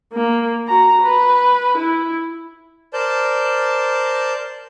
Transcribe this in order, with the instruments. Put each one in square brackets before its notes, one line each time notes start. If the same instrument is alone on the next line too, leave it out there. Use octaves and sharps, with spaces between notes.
[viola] A#3
F#4 A#5
B4
E4
[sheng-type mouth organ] A#4 C5 D5 A5 G6